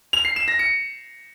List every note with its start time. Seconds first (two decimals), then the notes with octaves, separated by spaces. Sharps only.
0.13 F7
0.25 C7
0.36 E7
0.48 A#6
0.59 C#7